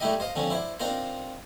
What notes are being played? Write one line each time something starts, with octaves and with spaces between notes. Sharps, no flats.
G3 A3 D#4 E4 G4 D#5
C5 D#5 F5
D3 F3 C4 C#4
E4 C5 D5
C4 D4 D#4 F4 A#4 C5